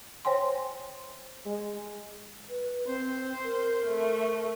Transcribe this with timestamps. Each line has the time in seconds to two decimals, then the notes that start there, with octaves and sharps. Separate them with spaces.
0.25 C5 C#5 G5 G#5 C6
1.46 G#3
2.49 B4
2.87 C4 C5
3.44 A#4
3.86 A3